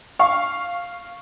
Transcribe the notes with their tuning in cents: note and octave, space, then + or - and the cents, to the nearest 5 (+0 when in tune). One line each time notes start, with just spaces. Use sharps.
F5 +0 C#6 +0